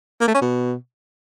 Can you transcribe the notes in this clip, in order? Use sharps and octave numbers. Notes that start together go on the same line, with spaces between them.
A#3
A3
C#4
B2